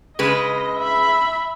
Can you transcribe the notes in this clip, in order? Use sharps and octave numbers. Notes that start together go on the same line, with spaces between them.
C#3 G#3 B4 D#5
E5 B5